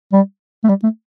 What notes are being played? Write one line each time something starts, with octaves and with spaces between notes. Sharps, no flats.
G3
A3
G3
A3